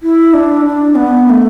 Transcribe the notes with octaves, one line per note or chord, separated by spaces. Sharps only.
E4
D4
D4
B3
B3
A3